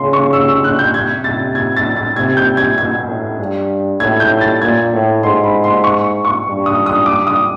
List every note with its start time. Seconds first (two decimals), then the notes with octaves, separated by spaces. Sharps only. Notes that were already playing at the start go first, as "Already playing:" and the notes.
Already playing: C#3 C6
0.13 C#6
0.33 E6
0.48 E6
0.64 F#6
0.79 G6
0.94 C3 G#6
1.24 A6
1.55 G#6
1.77 A6
1.96 A6
2.16 C3 G#6
2.37 G6
2.57 G#6
2.78 B2 G#6
3.09 A2
3.39 G2
4.00 A2 G#6
4.20 G6
4.41 A6
4.62 A#2 G#6
4.93 A2
5.23 G#2 C6
5.44 B5
5.64 C6
5.84 C#6
6.25 C#6
6.45 G2
6.66 D#6
6.86 D#6
7.06 D6
7.27 D#6